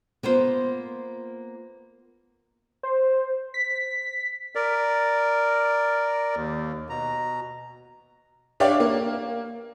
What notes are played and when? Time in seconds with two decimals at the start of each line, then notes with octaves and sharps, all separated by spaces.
0.23 A#3 B3 F4 C5
2.83 C5
3.54 B6
4.55 A#4 D5
6.36 D#2
6.90 B2 A#5
8.60 D4 G4 C#5 D5 E5 F5
8.80 A#3